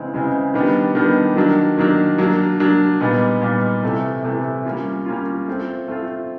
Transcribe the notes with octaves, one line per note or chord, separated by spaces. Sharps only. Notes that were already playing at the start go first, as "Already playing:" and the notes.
Already playing: C#3 E3 G#3 C4
C#3 E3 G#3 C4
D#3 G3 B3 D4 G4
D#3 G3 B3 D4 G4
D#3 F#3 A#3 D4
D#3 F#3 A#3 D4
F#3 A#3 D4
F#3 A#3 D4
A#2 G3 B3 D#4
A#2 G3 B3 D#4
C3 E3 A3
C3 E3 A3
G3 A#3 C#4 F4
G3 A#3 C#4 F4
A3 C4 F4
A3 C4 F4